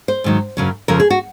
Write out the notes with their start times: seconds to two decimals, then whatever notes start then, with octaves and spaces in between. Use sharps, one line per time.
0.08 C5
0.24 G#2 D#3 F#3
0.57 F#2 C#3 F#3
0.88 F2 C#3 F3 A#4
1.00 G#4
1.10 F#4